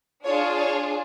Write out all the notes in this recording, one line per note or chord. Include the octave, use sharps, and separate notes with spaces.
D4 F4 G#4 C#5
C#5